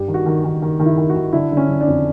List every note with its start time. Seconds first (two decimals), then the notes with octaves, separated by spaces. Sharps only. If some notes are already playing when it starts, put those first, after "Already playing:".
Already playing: G2 G4
0.08 D#3
0.14 F#4
0.26 D#3
0.44 D#3
0.62 D#3
0.79 D#3
0.86 E4
0.97 D#3
1.10 F#4
1.15 D#3
1.33 D3 E4
1.51 D3
1.57 C#4
1.69 D3
1.81 D4
1.87 F2